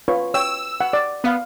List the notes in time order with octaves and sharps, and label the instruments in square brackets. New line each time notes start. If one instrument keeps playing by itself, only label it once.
[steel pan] F4 B4 C#5
[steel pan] C#5 G5 [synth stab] E6
[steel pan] F#5
D5
[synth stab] B3 [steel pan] F5 B5